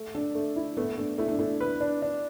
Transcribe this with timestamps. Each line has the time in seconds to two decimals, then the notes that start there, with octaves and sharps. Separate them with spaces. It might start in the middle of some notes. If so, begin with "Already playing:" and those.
Already playing: A3
0.15 D4 A4
0.35 A3
0.56 E4
0.77 A3 B3
0.98 A3 D4
1.18 A3 E4
1.28 D4
1.39 A3 E4
1.61 B4
1.81 D4
2.02 D4